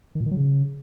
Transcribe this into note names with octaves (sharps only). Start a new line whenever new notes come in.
D#3
A#2
D#3
F#3
C#3